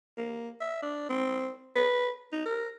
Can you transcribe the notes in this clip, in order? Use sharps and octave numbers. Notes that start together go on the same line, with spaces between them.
A#3
E5
D4
C4
B4
D#4
A#4